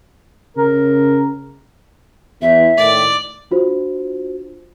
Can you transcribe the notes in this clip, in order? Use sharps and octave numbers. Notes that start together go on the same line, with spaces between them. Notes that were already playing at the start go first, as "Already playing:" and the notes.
C#3 A#4
E2 E5
A2 D#3 D5
D4 F4 F#4 C5